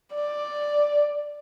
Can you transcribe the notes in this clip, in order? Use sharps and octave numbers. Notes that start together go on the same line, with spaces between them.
D5